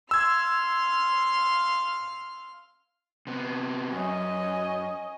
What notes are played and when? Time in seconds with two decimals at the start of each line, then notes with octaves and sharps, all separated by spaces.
0.11 F5 C6 E6 F6 G#6
3.27 C3 B3
3.93 F#2 C#4 D#5